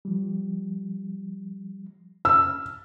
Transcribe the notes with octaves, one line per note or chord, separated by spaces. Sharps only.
F3 G3
E6 F6